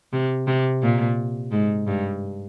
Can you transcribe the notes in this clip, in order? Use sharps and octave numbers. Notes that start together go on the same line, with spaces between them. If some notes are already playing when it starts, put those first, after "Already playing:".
C3
C3
A#2
G#2
G2